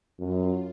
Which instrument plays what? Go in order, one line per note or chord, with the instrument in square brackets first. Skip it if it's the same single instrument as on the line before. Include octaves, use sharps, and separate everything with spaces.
[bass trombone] F#2 [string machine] F4